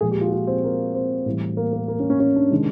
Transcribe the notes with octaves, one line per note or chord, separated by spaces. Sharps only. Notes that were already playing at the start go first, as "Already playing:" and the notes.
A#2 F3 G#3 G#4
G4
F4
F#4
F4
C4
A#3
C4
A2 E3 G3
A#3
A#3
A#3
C#4
C#4
C#4
D4
C3 D#3 G#3